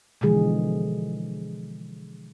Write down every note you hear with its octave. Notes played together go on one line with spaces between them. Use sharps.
B2 D3 E3 F3 G#3 G#4